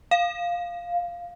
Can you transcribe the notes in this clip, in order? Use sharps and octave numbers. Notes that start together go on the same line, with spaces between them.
F5